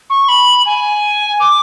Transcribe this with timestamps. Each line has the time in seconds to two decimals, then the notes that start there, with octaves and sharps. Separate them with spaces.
0.10 C#6
0.29 B5
0.66 G#5
1.40 D6